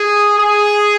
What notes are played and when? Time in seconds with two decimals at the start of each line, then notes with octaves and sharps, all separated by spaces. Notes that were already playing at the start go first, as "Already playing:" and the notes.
Already playing: G#4
0.37 G#4